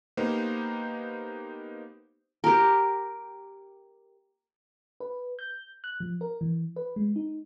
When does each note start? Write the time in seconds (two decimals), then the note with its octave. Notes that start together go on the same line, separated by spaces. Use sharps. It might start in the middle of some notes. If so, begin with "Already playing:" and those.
0.17 A#3 B3 D#4 G4 C5
2.44 G4 A#4
5.00 B4
5.39 G6
5.84 F#6
6.00 F3
6.21 A#4
6.41 E3
6.76 B4
6.96 G#3
7.16 D#4